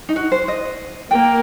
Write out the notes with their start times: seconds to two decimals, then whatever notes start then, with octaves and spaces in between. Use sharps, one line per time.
0.09 D#4
0.16 F#4
0.32 C5
0.48 D#5
1.11 A#3 G5